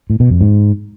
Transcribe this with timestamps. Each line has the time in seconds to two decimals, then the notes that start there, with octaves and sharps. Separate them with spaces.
0.10 A2
0.20 B2
0.30 F2
0.41 G#2